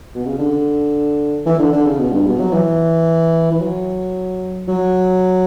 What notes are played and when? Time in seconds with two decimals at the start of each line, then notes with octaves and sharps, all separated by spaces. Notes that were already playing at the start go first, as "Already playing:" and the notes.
0.15 B2
0.26 C#3
0.39 D3
1.46 E3
1.59 D3
1.73 D3
1.86 C#3
1.99 B2
2.13 G2
2.27 B2
2.40 F#3
2.53 E3
3.51 E3
3.61 F#3
4.68 F#3